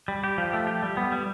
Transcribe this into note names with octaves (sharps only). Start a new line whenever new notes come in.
G3
G4
F3
A3
G4
G3
B3
G3